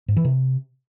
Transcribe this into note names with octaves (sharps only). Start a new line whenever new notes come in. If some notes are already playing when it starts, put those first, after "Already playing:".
G#2
E3
C3